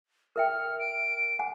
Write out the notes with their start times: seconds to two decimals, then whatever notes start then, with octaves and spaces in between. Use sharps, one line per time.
0.36 A#4 E5 G5 F6
0.79 D7
1.39 F#5 G#5